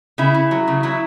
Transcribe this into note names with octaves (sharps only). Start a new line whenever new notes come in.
C#3 E4
C#3
F#3
C#3
F#3 E4